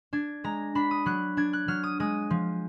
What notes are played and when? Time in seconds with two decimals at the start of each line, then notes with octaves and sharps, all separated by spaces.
0.13 D4 G#6
0.44 G#3 A#5
0.75 D4 B5
0.91 D#6
1.06 F#3 F#6
1.37 D4 G#6
1.53 F#6
1.68 F#3 F6
1.83 D#6
2.00 G#3 D#6
2.30 F3